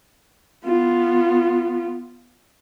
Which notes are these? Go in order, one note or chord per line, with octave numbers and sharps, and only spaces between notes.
B3 F4